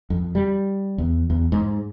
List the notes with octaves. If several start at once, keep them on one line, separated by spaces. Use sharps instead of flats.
F2
G3
E2
E2
G#2